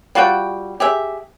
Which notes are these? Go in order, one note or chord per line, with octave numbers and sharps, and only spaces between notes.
G3 F4 F#4 G5
G4 G#4 E5